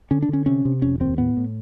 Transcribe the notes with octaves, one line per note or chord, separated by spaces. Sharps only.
D3 C#4
D4
D3 C#4
C3 C#4
C3
F1 C#4
D#2 C4
A2 B3
A2